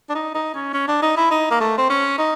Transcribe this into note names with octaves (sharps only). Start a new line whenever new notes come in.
D4
D#4
D#4
C#4
C#4
D4
D#4
E4
D#4
A#3
A3
C4
C#4
D#4